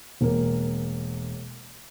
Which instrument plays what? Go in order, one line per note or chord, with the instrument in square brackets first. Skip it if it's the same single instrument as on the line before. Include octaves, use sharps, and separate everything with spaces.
[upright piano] E1 A#3